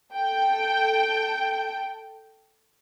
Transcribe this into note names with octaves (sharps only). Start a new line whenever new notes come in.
A4 G5